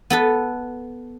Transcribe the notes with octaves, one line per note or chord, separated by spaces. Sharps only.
B3 A4 B4